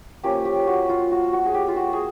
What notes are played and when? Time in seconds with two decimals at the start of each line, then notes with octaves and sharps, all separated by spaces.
0.23 F3 A#3 C#4 G4
0.45 G4
0.67 F#4
0.89 F4
1.12 F#4
1.33 F#4
1.46 G#4
1.54 G4
1.68 F4
1.76 F#4
1.93 G#4